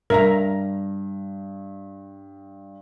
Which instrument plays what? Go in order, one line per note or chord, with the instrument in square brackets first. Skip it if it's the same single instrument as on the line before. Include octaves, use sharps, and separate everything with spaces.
[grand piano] G2 [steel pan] A#4 E5 A#5